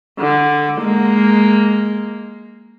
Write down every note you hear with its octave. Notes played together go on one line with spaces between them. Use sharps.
D3
G#3 A#3